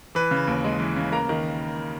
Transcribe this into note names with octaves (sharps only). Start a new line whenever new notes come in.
E3 B4
C#3
D#2
G#3
E3
C#3
A#3 A#5
D#3